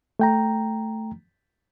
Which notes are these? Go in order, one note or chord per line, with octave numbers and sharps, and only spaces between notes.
A3 G5 A#5